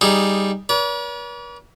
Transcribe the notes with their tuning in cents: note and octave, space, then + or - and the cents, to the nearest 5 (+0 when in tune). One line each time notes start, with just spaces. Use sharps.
G3 +0 D#4 +0 G#4 -10
B4 -45 D5 -45